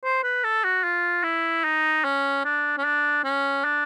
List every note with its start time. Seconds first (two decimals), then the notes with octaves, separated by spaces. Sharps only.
0.04 C5
0.23 B4
0.44 A4
0.64 F#4
0.84 F4
1.24 E4
1.64 D#4
2.04 C#4
2.45 D4
2.78 C#4
2.85 D4
3.24 C#4
3.64 D4